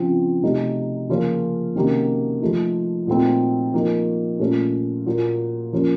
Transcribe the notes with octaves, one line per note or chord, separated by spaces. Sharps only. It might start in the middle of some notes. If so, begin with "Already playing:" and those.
Already playing: C#3 F3 C4 F4
C3 F#3 A3 D#4
C#3 F3 A#3 C#4 F4
C3 D#3 F#3 A#3 C#4
F3 A3 D#4
A#2 F#3 A3 C4 D#4
F3 A#3 D#4
A#2 A3 C#4
A#2 F#3 A#3
F3 A#3 C#4